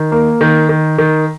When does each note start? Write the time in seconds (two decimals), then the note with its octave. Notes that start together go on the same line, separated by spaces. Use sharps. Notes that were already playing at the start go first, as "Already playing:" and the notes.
Already playing: D#3
0.12 A#3
0.41 D#3
0.69 D#3
0.98 D#3